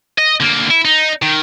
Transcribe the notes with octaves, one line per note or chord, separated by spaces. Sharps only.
D#5
D3 A#3
E4
D#4
D#3